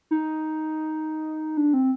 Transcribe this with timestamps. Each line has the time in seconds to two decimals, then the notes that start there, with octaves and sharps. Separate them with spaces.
0.11 D#4
1.57 D4
1.74 C4